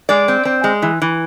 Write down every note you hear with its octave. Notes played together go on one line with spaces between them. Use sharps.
G#3 D5
C4
C4
G#3
E3
E3